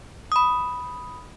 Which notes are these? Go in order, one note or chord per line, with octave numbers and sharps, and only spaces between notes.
B5 D#6